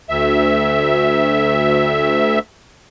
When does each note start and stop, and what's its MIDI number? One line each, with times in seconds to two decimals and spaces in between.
0.09 2.39 38
0.09 2.39 76